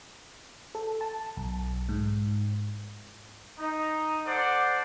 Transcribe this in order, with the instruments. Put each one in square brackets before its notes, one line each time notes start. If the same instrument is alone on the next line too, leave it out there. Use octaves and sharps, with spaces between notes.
[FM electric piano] A4
A5
B1
G#2
[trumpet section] D#4
A4 C5 D5 F#5